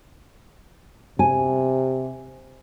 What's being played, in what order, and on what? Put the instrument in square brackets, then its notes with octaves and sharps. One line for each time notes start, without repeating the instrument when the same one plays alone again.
[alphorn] C3 [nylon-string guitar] G#5